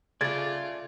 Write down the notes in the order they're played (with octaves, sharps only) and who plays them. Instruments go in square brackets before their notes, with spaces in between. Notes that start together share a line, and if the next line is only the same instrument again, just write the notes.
[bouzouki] C#3 A3 [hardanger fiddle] F4 [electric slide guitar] D5 [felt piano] G#6 A6